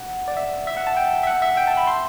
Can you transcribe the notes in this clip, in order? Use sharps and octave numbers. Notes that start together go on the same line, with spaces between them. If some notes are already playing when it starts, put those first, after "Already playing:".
Already playing: F#5
D5
E5
E5
F#5
A5
G5
E5
F#5
E5
G5
A5
B5
C6